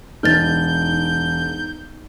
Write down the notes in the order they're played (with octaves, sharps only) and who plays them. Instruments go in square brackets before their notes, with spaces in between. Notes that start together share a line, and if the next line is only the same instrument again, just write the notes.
[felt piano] E1 [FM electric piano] D#4 [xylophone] F6 A6 [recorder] G6